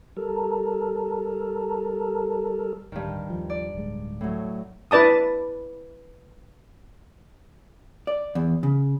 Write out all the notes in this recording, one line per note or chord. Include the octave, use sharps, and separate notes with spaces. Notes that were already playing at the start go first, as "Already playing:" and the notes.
G3 A4 A#4
D1 G2 D#3
D#2 F3
D5
D1 G#3
A2 F#3
E4 B4 D5 A5 D#6
D5
E2
C#3